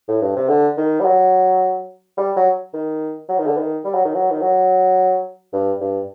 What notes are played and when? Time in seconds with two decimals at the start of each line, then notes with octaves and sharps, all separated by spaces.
0.08 A2
0.22 G2
0.36 C3
0.49 D3
0.77 D#3
1.00 G3
1.05 F#3
2.18 G3
2.37 F#3
2.74 D#3
3.29 F#3
3.39 D#3
3.47 D3
3.58 D#3
3.85 G3
3.94 F#3
4.05 D#3
4.14 F#3
4.31 D#3
4.42 F#3
5.53 G2
5.81 G2